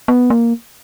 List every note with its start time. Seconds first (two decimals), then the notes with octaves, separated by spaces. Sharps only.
0.08 B3
0.30 A#3